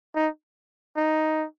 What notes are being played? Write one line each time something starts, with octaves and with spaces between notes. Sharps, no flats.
D#4
D#4